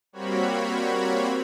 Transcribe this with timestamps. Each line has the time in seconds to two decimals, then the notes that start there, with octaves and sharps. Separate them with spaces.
0.13 G3 A#3 C4 F#4 C#5 B5